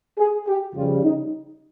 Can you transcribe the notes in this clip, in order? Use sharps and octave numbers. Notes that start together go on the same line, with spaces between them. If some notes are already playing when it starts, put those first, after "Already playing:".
G#4
G4
F2 C#3 G3 F4
D#4